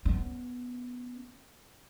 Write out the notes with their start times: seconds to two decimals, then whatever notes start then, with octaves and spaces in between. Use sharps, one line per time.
0.05 B3 C#4